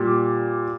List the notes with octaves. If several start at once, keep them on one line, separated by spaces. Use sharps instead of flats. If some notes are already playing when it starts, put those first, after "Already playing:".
Already playing: A#2 G3